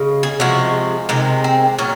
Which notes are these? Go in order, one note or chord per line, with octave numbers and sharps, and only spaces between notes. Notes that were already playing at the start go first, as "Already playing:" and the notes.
Already playing: C#3 G#3
G#4
C3 F3 G#3 F#4
C3 D#3 G#3 D#4
C4
A#2 F#3 C#4